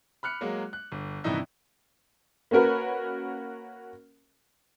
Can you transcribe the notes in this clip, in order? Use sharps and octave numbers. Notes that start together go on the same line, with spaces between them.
B5 F6 F#6 C#7
F#3 G#3 A#3
F#6
G1
G2 C3 D#3 E3 D#4 E4
A#3 C#4 F#4 A#4 B4